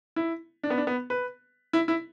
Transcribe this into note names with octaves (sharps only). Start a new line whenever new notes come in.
E4
D4
B3
D4
B3
B4
E4
E4